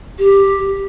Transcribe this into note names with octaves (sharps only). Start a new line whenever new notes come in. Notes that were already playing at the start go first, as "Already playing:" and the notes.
G4